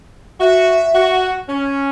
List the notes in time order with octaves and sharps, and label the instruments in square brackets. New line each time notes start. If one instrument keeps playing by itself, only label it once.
[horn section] F#4 [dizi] E5
[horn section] F#4
C#4